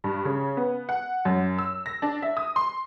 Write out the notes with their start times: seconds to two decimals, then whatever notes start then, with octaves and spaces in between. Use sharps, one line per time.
0.04 G2
0.25 C#3
0.57 B3
0.89 F#5
1.25 F#2
1.58 E6
1.86 A#6
2.02 D4
2.22 E5
2.37 D#6
2.56 C6